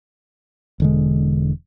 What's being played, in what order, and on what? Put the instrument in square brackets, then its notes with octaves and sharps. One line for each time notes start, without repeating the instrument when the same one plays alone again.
[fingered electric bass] E1 D3 G#3